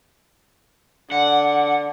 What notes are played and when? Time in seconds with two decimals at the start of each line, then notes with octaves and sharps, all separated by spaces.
1.12 D3 F#5